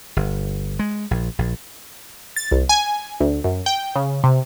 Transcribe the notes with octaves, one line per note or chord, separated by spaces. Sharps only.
G1
G#3
A#1
A#1
A6
C2
G#5
D2
F#2
G5
C#3
C3